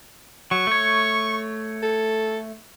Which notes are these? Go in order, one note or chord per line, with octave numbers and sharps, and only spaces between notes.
F#3 C#6
A3 C#5
A4